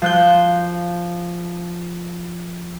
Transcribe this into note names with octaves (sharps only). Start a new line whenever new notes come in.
F3 F#6 G6